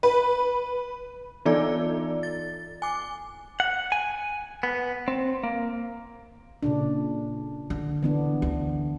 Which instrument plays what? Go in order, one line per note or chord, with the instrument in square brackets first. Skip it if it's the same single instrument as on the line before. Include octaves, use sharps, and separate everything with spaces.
[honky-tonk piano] B4
[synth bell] E3 B3 D#4 F4 A4 D5
A6
G#5 D6
[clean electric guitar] F#5
G#5
B3
C4
A#3
[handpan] A#2 C#3 D4
[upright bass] D3
[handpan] E3 B3 D4
[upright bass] D2